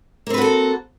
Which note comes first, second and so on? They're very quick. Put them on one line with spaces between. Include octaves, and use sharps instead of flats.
A#3 C4 B4 F#4 A4